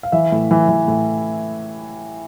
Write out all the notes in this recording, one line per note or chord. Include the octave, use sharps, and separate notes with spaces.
F5
E3 E5
A2
E3
E3
A2